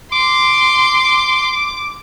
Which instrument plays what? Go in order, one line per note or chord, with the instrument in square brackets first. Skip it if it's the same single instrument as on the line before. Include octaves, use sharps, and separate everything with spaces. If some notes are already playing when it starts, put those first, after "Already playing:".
[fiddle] C6 [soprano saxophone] D6